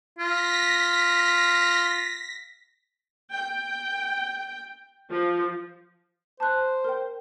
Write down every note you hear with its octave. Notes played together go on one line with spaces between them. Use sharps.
F4 A#6 B6
G5
F3
C5 A5 F#6
A#4 G5